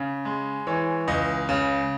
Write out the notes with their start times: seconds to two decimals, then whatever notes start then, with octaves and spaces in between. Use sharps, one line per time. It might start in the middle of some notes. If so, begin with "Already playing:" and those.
Already playing: C#3
0.25 G#3
0.67 E3 C#5
1.08 C#2 D#5
1.49 C#3